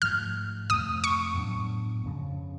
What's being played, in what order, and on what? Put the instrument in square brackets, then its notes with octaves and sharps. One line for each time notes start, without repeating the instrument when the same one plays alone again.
[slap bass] G#2 F3 A3 [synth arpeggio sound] F6
[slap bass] F2 C3 F3 A3 [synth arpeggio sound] D#6
[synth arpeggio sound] C#6
[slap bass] A2 F#3 B3 D4
F2 C#3 F3